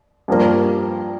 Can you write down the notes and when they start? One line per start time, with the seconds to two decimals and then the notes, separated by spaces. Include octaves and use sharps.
0.28 G2 F3 A#3